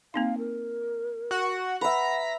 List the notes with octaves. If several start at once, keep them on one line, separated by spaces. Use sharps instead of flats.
A#3 C4 D#4 F5
A#4
F#4 F#5
B4 E5 F#5 A#5 B6